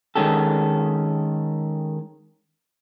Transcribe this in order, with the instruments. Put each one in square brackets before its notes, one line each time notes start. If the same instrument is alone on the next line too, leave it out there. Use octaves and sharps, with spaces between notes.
[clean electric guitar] D#3 G#3 C#4 G4 A4